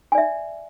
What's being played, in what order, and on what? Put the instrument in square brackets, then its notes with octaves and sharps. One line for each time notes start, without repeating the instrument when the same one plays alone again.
[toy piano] G#5
D5
E5